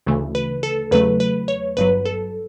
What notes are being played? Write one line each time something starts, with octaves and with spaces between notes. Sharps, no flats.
D2 C#3 E3 A3
B4
A4
E2 C#3 F#3 A3 B4
B4
C#5
G1 G2 F#3 B4
A4